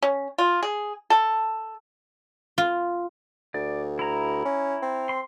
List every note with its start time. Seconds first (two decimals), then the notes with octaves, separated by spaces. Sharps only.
0.02 C#4
0.38 F4
0.63 G#4
1.10 A4
2.58 F4
3.54 D2 D5
3.99 E4 A#5
4.45 C#4
4.83 C4
5.09 C6